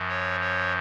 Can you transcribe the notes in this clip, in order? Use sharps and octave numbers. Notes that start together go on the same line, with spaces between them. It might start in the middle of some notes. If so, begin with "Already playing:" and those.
Already playing: F#2 F3
C#5
C#5